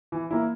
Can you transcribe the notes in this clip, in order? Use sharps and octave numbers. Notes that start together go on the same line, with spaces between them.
E3
A#3 E4